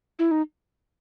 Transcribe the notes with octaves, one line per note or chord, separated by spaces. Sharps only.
E4
D#4